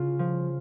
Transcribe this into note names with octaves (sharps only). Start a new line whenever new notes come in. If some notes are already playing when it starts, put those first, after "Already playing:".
Already playing: C#3 F4
F3